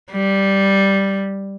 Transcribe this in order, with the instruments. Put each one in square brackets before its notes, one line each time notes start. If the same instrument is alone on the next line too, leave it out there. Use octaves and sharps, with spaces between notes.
[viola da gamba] G3